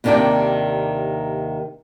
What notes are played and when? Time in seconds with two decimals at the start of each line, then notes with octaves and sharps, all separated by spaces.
0.04 D#2 C3 D#3 D4 D5 G5